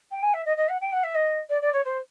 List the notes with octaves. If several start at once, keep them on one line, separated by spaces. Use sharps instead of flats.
G5
G#5
E5
D#5
D#5
F#5
G5
F#5
E5
D#5
D5
D5
C#5
C5